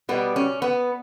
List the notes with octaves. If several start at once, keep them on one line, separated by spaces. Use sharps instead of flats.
B2 G3 B3
C#4
B3